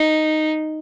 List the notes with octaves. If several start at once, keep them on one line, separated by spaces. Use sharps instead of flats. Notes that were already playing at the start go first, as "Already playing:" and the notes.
Already playing: D#4